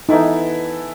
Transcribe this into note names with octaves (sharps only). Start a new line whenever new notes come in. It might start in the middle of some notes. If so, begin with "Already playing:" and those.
E3 B3 D#4 E4 A4